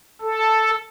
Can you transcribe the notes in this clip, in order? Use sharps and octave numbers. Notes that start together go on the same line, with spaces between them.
A4